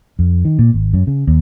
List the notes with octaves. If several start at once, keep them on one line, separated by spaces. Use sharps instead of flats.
F2
D#3
A#2
G#1
F#2
C#3
D#2